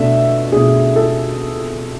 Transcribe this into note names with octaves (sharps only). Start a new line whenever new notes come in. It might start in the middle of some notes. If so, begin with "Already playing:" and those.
Already playing: B2 A3 D4 E5
B2 A3 D4 G#4
A4